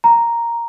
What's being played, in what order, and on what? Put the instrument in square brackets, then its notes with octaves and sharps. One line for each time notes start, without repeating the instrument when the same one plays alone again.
[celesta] A#5